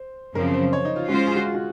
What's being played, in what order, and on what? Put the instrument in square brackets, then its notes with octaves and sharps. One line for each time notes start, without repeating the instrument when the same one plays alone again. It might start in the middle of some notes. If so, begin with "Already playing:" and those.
Already playing: [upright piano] C5
[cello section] F#2 C#3 F3 C4 [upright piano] A#4
[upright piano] C5
C#5
D#4
F4
[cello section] G#3 C#4 F4 C5 [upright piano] F#4
[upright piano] G#4
F#4
F4
F#4